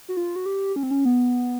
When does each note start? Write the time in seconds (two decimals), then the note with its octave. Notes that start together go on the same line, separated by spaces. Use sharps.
0.09 F#4
0.17 F4
0.36 F#4
0.46 G4
0.76 C#4
0.83 C4
0.91 C#4
1.05 B3